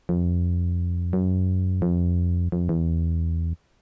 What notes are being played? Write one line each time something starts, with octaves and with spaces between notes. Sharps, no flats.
F2
F#2
F2
F2
E2